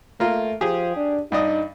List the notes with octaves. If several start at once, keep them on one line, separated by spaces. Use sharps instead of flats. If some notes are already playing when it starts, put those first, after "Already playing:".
A3 A#3 F4
F3 G4 G#4
D4
G2 D4 D#4 D#5